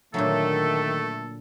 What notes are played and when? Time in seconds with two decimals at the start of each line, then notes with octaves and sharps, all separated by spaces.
0.14 A#2 D3 D#3 F#3 A3 A4